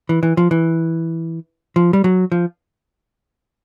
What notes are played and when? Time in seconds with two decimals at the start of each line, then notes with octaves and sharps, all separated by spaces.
0.09 E3
0.23 E3
0.37 F3
0.51 E3
1.76 F3
1.93 G3
2.04 F#3
2.32 F3